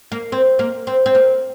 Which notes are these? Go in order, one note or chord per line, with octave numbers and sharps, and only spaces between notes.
A#3
C4
A#3
C4
C4
A#3